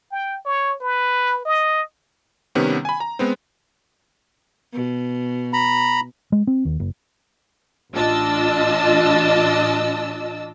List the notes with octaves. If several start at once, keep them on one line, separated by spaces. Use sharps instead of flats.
G5
C#5
B4
D#5
C3 D#3 G3 B3 C#4
G#5 B5
A#5
G#3 B3 C4
B2
A#5 B5
G#3
C4
D#2
F#1
A1 D4 F4 D#5 A5 E6